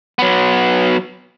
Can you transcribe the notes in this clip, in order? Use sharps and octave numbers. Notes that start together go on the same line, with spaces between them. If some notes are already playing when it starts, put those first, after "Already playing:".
F#3 B3